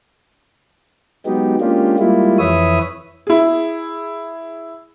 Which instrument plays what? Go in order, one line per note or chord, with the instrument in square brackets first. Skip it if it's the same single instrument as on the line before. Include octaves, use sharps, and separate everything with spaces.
[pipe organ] F#3 G#3 B3 D#4 G4
G#3 A#3 C#4 D4 F4 G4
G3 G#3 A#3 E4 F4
F2 E3 B4 C#5 E5 D#6
[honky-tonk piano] E4 G#4